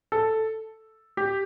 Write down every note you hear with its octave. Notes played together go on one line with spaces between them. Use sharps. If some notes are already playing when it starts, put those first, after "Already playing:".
A4
G4